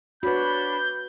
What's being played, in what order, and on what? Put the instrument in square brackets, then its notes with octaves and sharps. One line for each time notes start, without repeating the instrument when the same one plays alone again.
[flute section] D4 C#5 B5 [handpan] F#4 B4 [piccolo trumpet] G6